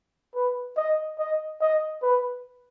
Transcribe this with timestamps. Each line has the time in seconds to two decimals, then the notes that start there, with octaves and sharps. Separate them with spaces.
0.35 B4
0.77 D#5
1.19 D#5
1.61 D#5
2.02 B4